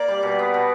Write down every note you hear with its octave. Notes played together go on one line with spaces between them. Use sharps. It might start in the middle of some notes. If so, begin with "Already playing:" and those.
Already playing: A#3 D5
G3
B2
B3
B2